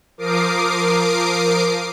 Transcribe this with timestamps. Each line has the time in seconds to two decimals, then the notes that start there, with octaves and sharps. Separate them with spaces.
0.17 F3 A#4 D6 D#6 C7 D7